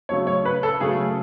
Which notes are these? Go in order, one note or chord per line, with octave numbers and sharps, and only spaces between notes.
C#3 F#3 A3 C#5
C#5
B4
A4
C#3 F#3 A3 G#4